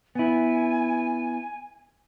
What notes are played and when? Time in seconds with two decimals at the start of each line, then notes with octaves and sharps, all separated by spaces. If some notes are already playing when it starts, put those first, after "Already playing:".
0.15 B3 E4 G#5